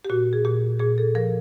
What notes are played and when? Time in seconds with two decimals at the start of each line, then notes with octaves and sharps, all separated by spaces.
0.05 G4
0.10 A#2 F#4
0.33 G#4
0.45 A#2 G4
0.79 A#2 G#4
0.98 A4
1.15 F3 A#4